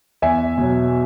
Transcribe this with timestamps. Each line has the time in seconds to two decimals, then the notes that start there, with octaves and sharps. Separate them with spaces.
0.22 E2 E5 G#5
0.58 B2 F#3